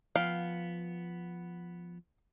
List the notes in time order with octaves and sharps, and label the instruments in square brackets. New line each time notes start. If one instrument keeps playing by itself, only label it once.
[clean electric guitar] F3 B3 G5 [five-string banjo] F5